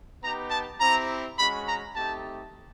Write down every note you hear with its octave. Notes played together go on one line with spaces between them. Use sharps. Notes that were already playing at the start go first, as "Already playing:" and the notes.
B3 D#4 G4 A#5
A5
C4 E4 G4 A#5
G#3 C#4 F#4 B5
A#5
A3 C4 D#4 G4 A5